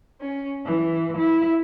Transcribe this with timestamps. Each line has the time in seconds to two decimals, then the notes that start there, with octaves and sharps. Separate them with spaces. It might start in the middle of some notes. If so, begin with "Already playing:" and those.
0.21 C#4
0.64 E3
1.17 E4